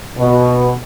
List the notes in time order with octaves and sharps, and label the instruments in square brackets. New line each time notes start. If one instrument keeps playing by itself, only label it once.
[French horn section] B2